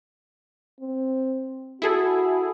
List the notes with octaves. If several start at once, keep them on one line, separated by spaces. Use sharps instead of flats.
C4
E4 F#4 G#4 A4